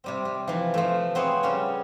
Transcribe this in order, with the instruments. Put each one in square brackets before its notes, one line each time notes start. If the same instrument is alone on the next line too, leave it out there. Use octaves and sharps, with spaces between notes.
[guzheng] C3 G3 C4
G3
E3 F3
F3 A3
B3 C4 G#4 C#5
C#3 G3 C#4